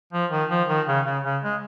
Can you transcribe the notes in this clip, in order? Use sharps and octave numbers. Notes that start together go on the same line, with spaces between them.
F3
D#3
F3
D#3
C#3
C#3
C#3
G#3